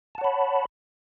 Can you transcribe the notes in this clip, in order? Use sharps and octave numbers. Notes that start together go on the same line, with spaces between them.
C#5 F#5 A5 B5